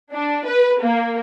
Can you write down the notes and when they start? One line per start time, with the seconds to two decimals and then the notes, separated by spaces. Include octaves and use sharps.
0.12 D4
0.46 B4
0.81 A#3